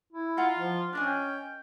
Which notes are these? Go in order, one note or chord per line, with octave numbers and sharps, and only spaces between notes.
E4
F4 D#5 F#5 A#5
F3
C#4 D4 A#4 D#5 G#5
G5